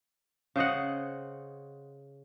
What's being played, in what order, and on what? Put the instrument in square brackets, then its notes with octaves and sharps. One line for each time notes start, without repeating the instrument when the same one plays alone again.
[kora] C#3 C5 D#5 F#5